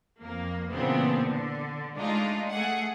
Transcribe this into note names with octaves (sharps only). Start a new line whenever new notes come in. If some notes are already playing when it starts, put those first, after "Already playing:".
F2 A#3
A#2 C#3 E3 B3 C4 D4
D3
G#3 A3 D4 D#4 F4
A3 G#4 F#5